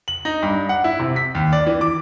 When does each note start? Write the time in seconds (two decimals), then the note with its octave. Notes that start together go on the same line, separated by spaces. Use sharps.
0.08 F#7
0.25 D#4
0.43 G2
0.69 F#5
0.84 E4
1.00 C3
1.16 B6
1.35 D#2
1.53 D5
1.67 E3
1.81 D6